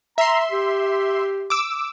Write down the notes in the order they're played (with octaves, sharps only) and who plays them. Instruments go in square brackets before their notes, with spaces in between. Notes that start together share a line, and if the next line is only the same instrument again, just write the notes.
[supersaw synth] E5 C6 [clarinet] A#5
[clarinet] G4
[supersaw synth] D6 E6